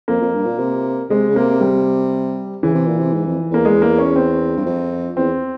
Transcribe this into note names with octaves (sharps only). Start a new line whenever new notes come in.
F2 A#3
F2
G2
A#2
C3
C3 G#3
C#3
C3 A#3
G3
C#3 E3
C3
A#2
C3
G#2
F2
E2 A#3
G#3
A#3
C#4
C4
G2
F2
E2 C4